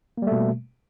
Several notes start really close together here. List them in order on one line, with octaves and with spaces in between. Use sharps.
A#3 G3 A3 B2